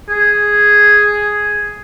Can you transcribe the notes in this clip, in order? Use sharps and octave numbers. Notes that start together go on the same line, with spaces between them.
G#4